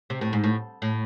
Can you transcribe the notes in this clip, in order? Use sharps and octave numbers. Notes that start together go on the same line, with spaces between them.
C3
A2
G#2
A2
A2